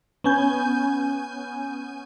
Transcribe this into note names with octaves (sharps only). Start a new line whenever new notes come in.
B3 C#4 G#5 G6